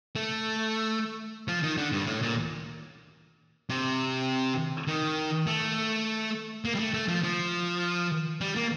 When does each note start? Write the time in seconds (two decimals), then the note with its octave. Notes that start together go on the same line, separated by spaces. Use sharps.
0.15 A3
1.48 F3
1.63 D#3
1.77 D3
1.92 G2
2.07 A2
2.22 A#2
3.69 C3
4.87 D#3
5.47 A3
6.65 A#3
6.75 G3
6.79 A3
6.94 A3
7.08 F3
7.24 F3
8.41 G3
8.56 A#3